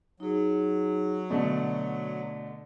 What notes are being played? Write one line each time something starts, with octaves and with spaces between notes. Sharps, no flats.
F#3 D#4 G#4
B2 D3 A3 D5